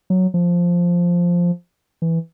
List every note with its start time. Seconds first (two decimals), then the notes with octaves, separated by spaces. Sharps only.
0.10 F#3
0.34 F3
2.02 E3